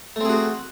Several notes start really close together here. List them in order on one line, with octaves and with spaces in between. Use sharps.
A3 C4 G#4 F#4